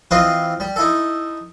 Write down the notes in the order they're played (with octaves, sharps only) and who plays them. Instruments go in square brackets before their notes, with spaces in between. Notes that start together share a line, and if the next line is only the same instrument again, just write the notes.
[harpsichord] E3 C4 F4 B4 D#5
G3
D#4 E4 A4